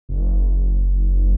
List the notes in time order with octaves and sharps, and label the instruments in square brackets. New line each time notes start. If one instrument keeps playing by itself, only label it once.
[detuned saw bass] F#1